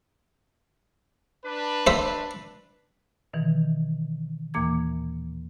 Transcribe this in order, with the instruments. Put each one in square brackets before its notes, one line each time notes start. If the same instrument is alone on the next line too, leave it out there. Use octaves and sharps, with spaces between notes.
[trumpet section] D4 B4
[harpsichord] C5 E5
[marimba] B2 D#3 E3
D#2 A#2 E3 A#3 D6 G#6